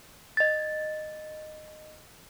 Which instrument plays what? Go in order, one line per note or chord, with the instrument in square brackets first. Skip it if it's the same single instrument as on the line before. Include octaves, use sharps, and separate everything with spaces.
[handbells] D#5 A6